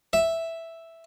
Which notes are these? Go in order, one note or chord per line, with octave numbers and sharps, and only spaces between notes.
E5